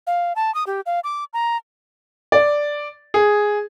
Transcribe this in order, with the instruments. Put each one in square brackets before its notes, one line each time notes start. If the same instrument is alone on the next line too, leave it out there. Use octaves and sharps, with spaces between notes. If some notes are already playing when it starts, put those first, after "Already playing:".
[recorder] F5
A5
D#6
G4
F5
D6
A#5
[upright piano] D5
G#4